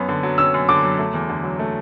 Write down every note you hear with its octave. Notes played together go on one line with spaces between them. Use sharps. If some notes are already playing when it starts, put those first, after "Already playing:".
Already playing: F#2 B3 C#4
D3
F#3
C#4 E6
F#2
D3 D6
F#3
A3
E2
D3
F#3
A3